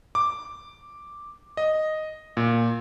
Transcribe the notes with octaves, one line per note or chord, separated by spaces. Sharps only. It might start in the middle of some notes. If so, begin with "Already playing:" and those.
D6
D#5
A#2